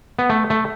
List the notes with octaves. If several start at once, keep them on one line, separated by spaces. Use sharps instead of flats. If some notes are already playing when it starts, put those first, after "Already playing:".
B3
A3
A3